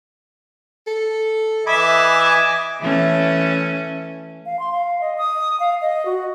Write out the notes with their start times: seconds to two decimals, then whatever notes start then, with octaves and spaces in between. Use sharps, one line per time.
0.87 A4
1.66 E3 D#5 E5 G#5 B5 D6
2.80 E3 A3 C#4
4.46 F5
4.59 C6
4.72 F5
5.01 D#5
5.18 D#6
5.60 F5
5.81 D#5
6.05 F#4